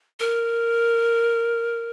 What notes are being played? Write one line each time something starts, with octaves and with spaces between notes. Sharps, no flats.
A#4